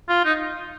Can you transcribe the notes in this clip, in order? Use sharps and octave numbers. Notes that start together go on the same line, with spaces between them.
F4
D#4